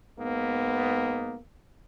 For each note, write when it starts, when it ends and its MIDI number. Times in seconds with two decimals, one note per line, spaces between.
0.19 1.37 44
0.19 1.37 58
0.19 1.37 59